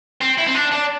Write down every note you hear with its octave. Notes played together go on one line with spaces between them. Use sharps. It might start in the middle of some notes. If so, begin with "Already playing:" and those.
C4
E4
C4
D4
D4